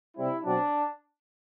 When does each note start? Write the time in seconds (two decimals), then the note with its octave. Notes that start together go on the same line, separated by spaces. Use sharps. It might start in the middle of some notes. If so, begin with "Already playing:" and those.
0.16 C3 G3 C4 E4
0.44 B2 F#3 C4 D4